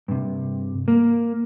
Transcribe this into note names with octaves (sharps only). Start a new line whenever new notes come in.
G2 C3
A#3